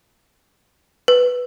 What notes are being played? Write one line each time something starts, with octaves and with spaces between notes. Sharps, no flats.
B4